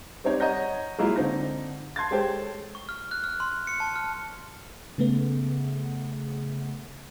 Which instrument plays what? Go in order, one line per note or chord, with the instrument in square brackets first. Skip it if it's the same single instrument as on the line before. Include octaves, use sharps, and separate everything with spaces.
[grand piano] G3 C4 D#4 C#5 D5
C#5 D#5 F#5 A#5 G6 A#6
F#3 G#3 A#3 E4 F4 D#5
D3 C4 D#4 A#6
A5 C6 G#6 A6
G#3 G4 A4 C5 C#5 G5
[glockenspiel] C#6
F6
F#6
F6
C6
C#7
A5
F6
[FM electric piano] C#3 A3 B3